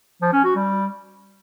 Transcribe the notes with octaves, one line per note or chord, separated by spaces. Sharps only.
F3
C#4
F#4
G3